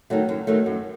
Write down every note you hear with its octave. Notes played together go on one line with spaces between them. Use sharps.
D#3 F#3 A3
F#2
D#3 F#3 A3
F#2